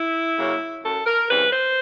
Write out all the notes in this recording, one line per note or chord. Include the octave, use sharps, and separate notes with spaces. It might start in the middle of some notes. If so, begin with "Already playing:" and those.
Already playing: E4
C#3 F#3 A#3 C#4
F#2 A4
A#4
C#3 E3 G3 C4 B4
C5